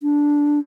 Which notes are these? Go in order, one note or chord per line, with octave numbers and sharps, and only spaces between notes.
D4